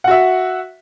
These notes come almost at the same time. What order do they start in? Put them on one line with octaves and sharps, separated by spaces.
F#5 F#4 E5